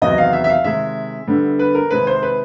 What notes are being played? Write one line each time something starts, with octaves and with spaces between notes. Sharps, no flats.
E2 C3 D#3 F#3 B3 D#5
F5
E5
E5
F5
C3 D#3 G#3 E5
D3 G3 B3
B4
A#4
C3 D#3 G#3 C4 B4
C5
B4